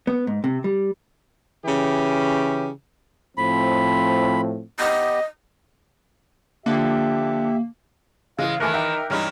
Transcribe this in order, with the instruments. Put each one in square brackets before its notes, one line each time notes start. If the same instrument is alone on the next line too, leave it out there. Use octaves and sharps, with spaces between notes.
[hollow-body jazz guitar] B3
G#2
C3
G3
[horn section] C#3 E3 C#4 G4
[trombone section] A2 F3 C4 [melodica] B5
[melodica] B3 G4 [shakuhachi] D#5
[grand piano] D3 F3 [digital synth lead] A#3 [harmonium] G4 E5
[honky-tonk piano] C#3 E3 [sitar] G#3 [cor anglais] F5
[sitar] D#3 E3 [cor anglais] A3 [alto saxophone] A#4 [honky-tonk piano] G#5 D6 F#6
[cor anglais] D#4 [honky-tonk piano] E5 G5
[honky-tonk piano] C#2 G2 F6 [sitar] E3 C#4 E4 [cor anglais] D#4